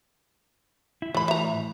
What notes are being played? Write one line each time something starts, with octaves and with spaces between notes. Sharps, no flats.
E4
A2 E3 A3 B5
E5 A#5